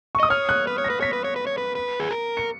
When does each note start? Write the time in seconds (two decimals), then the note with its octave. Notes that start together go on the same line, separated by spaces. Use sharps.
0.15 C#6
0.20 D#5 D#6
0.30 C#5 F6
0.49 F#6
0.67 B4
0.78 C#5
0.84 A#6
0.90 B4
1.01 C#5 B6
1.13 B4
1.24 C#5
1.36 B4
1.47 C#5
1.58 B4
1.75 B4
2.00 G#4
2.11 A#4
2.37 C#7